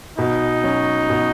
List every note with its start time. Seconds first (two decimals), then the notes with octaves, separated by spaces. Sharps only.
0.18 B2 D#4
0.64 F#3 C#4
1.10 B2